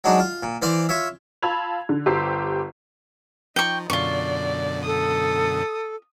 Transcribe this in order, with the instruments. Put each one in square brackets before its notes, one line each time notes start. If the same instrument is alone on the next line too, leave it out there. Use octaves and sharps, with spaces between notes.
[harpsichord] F#3 G#3 D4 D#4
F4
A#2
E3 C5 D5 F5
F4 C#5 E5
[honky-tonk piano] F4 A5 B5 E6 G#6 F7
D3
G1 G4 C5 E6 C7
[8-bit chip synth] F3 [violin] D#4 [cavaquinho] G5 C#6
[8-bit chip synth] F#2 B2 D3 [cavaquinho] F4 C#6 [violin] D5
[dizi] A4 [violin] D#6